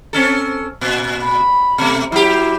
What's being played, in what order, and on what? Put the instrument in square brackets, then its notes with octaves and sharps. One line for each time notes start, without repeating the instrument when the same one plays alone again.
[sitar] C4 C#4 A4
A#2
[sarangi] B5
[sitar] B2 A3
[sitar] F#3 G4 [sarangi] E4